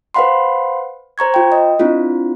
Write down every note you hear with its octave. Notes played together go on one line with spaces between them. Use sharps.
B4 C5 F5 F#5 B5 C6
C5 A#5 C#6 G#6
F4 G5
D#5
C4 D4 E4 F4